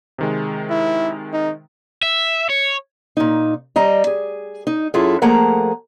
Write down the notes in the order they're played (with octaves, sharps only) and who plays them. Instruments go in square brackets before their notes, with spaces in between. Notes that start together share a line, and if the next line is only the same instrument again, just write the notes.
[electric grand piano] C3 D#3 G#3
[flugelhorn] E4
D#4
[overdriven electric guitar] E5
C#5
[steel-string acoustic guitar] A#2 D#4
G3 D#5 A#5
G#4
D#4
F#2 E4 F4 G#4 A4
F3 A3 A#3 G#4 F#5 A#5